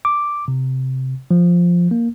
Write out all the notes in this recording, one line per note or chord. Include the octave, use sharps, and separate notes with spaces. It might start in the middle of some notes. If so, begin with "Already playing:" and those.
D6
C3
F3
A#3